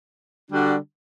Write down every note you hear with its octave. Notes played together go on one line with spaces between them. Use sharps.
D3 G3 D4 F#4